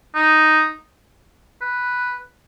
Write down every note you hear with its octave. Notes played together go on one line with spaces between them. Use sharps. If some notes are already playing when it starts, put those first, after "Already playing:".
D#4
B4